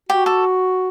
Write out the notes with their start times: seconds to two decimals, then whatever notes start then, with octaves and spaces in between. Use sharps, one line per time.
0.09 F#4 G4
0.26 A4